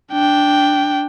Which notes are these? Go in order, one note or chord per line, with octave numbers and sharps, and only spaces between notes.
D4 G5